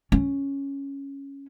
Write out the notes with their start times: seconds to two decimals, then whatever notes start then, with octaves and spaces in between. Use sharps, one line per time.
0.12 C#4